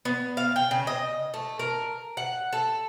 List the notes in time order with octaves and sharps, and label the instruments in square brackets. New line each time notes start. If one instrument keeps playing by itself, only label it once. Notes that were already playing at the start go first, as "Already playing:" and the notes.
[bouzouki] B3
F5
G5
C#3
D#5
A3
A#4
F#5
A4